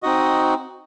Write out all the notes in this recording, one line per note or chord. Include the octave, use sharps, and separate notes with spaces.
C4 D#4 F#4 D#5